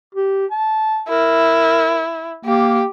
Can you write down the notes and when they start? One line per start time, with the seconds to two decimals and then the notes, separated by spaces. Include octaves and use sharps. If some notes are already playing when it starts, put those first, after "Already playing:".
0.15 G4
0.51 A5
1.09 E4 A#4
2.45 A#3 G4